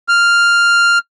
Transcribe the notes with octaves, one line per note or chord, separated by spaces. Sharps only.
F6